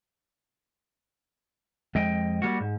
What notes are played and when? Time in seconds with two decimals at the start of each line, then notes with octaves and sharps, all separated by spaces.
1.95 F2 G#3 D#5 G5
2.42 G3 A#3 F#4
2.60 G#2